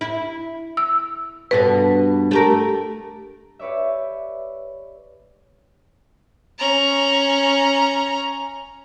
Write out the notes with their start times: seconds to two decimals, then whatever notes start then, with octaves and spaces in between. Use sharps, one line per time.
0.01 E4
0.77 E6
1.51 G2 B2 A4 B4
2.31 A3 G4 A#4
3.59 G4 B4 C#5 D5 E5
6.59 C#4 A#5